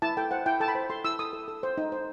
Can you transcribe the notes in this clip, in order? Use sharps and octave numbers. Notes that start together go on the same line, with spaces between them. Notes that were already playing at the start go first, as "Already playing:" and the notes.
E4 A5
A4 G5
C5 F#5
E4 G5
A4 A5
B5
C5
A4 C6
E4 E6
A4 D#6
A4
A4
C5
D#4
C5